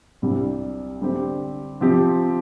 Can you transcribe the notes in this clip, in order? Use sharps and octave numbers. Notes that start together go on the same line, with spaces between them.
C2 C3 G3 D4 G4
D3 G3 C4 G4
C3 F3 C4 G4